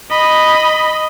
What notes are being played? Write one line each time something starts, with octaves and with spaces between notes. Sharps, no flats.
D#5 B5